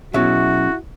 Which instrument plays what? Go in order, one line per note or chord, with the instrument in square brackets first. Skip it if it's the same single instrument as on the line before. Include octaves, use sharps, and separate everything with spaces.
[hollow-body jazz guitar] B2 F#3 [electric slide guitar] C#4 G#4 E5 [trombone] E4 [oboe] F#4